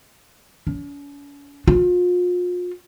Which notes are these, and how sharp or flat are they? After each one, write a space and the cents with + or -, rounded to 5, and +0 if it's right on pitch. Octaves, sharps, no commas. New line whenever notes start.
C#4 +45
F4 +40